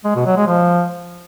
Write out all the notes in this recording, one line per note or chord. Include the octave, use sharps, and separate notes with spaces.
G#3
B2
F#3
G#3
F3